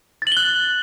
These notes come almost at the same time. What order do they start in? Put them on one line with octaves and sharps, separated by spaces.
A6 F#7 G7 F#6